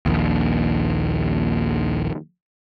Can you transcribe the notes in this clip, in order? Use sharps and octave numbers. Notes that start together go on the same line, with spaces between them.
A#1 D#2